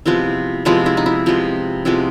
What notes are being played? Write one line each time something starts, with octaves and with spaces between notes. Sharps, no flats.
C3 F3 G#3 B3 E4
C3 F3 G#3 B3 E4
E4
D#4
E4
C3 F3 G#3 B3
C3 F3 G#3 B3 E4